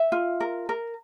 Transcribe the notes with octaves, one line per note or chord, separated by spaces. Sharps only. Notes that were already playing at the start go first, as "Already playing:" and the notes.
Already playing: E5
F4
A#4
A#4